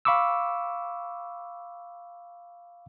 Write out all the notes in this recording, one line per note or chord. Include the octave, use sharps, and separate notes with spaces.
F5 B5 C#6 D6 E6